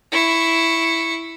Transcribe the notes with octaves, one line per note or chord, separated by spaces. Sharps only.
E4 C#6